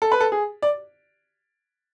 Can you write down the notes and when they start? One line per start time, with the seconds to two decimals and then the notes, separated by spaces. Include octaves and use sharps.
0.02 A4
0.12 B4
0.21 A4
0.32 G#4
0.62 D5